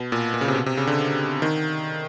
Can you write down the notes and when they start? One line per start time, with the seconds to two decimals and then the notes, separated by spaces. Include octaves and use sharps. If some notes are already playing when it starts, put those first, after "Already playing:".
Already playing: B2
0.12 A#2
0.34 A#2
0.41 C#3
0.48 C3
0.56 B2
0.66 C3
0.77 C#3
0.87 D3
1.42 D#3